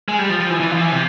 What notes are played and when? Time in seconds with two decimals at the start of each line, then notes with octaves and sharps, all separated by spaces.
0.08 G#3
0.19 G3
0.29 F3
0.40 F3
0.50 E3
0.60 E3
0.71 F3
0.81 E3
0.92 C3